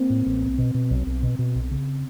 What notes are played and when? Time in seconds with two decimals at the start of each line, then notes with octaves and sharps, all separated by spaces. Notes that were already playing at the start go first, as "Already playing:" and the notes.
Already playing: A#3 C4
0.10 A2
0.26 A1
0.42 B1
0.58 B2
0.74 B2
0.91 B1
1.07 B1
1.23 B2
1.39 B2
1.55 B1
1.71 C#3